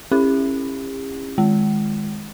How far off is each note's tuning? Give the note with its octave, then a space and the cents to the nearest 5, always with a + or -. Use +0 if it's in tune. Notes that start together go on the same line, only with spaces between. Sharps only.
C#4 -35 E4 +0 G4 +45
D#3 +0 G#3 +0